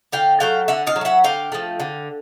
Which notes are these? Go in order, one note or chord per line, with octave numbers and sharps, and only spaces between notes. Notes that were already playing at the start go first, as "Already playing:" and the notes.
D3 F5 G5
F#3 A3 F5 G5
D3 E5 F#5
D#5 F5
F#3
A3
E5 F#5
D3 F5 G5
F3 A3
D3